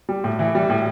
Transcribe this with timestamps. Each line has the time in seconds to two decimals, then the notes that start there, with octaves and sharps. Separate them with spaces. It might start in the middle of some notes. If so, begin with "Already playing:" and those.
0.09 G3
0.24 A2
0.39 E3
0.55 G3
0.70 A2